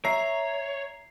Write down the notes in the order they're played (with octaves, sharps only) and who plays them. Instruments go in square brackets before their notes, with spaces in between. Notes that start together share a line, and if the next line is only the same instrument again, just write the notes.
[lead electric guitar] C#5 [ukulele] E5 [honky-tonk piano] A#5 [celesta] C7